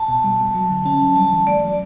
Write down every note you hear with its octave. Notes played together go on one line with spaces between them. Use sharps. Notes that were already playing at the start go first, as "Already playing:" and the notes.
Already playing: A5
B2
G3
B2
F#3
D3
C#4 A5
F#3
G3 A5
E3
A3 D5
F#3